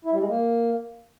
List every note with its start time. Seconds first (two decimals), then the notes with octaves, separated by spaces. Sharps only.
0.05 E4
0.13 G3
0.20 G#3
0.28 A#3